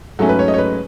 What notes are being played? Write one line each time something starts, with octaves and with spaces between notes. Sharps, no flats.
G#2 F#3 A3 C#4 A4
B4
C#5
D#5
C#5
B4